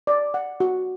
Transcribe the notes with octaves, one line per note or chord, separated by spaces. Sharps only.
D5
F#5
F#4